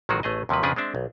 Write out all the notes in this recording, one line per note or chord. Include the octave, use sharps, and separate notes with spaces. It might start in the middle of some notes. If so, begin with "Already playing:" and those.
A1 D#3 F#3 G#3 F4 F#4
A1 A3 G#4 D#5
D#2 C3 F3 F#3 B4
F2 C#3 F3 D4 G#4 B4
G#3 C4 D4 E5
B1